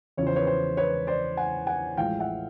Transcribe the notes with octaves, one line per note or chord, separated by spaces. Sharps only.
E2 C#3 F3 C#5
C5
B4 C#5
C5
B4 C#5
C5 D5
F#5 G#5
F#5 G#5
A1 A2 F3 G#3 F5 G5
E5 F#5